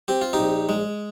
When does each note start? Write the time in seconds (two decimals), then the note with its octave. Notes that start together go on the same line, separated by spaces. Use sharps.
0.08 C4 G4
0.21 F4
0.33 D#4 G4
0.39 A#1
0.69 G#3